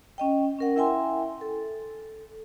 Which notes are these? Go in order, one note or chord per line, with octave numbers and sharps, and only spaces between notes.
C#4 D#5 G5
C#4 A#4 F#5
E4 E5 G5 G#5 C6
A4